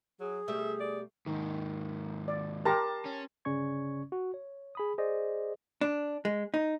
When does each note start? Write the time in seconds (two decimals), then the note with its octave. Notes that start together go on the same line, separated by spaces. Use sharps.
0.20 F#3 G#4
0.48 B2 G3 A3 E5
0.80 D5
1.26 D#2 G#2 D#3
2.28 D5
2.65 G4 A#4 A5 C6 A#6
3.05 C#4
3.45 G1 C#3 C#4 D5 C#6 G#6
4.12 F#4
4.34 C#5
4.75 G#4 B5 D#6
4.98 G#4 C5 D5 D#5
5.81 D4
6.25 G#3
6.54 D#4